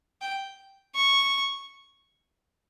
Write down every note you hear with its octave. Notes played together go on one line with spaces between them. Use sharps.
G5
C#6